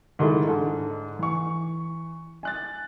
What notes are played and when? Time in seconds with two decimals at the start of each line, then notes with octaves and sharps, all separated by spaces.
0.19 G#2 D#3 G#3 A3 E4
0.47 G#2 D3 A4
1.19 E3 C#6
2.43 G#5 F#6 A6